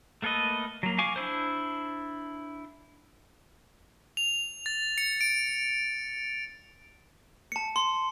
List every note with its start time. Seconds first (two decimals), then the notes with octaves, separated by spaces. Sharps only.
0.22 A3 A#3 A4 B4 D#5
0.83 F#3 A#3
0.98 F5 G#5 C#6 D6
1.16 D4 E4 C5
4.17 F7
4.66 A6
4.98 C#7
5.21 D7
7.52 A5 C#7
7.76 C6